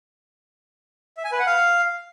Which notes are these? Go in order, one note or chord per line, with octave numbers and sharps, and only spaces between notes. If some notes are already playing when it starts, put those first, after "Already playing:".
E5
G#5
B4
F#5
F5